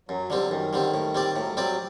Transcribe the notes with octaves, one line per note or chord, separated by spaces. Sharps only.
F#2 F#3
D3 D#3 G3 C4
F#3
F#2 D#3
D3 G3 C4
A2
G3 C4 G4 D5
A2 F#3
F#3 G3 C4 G4 D5